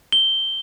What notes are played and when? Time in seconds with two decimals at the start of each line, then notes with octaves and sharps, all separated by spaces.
0.12 G7